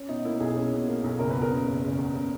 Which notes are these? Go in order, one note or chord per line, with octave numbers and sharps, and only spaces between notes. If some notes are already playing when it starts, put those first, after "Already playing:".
Already playing: C#4
B2 D#4
A#3 E4
B1 G#4
C#4
B2
A#3
B1
F#1 A#4
B4
E2
A#4
C#3
F#1
F#1
E2
C#3